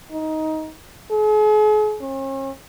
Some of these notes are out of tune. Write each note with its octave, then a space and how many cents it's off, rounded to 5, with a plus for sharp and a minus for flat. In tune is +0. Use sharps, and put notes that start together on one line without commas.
D#4 +15
G#4 +40
C#4 -45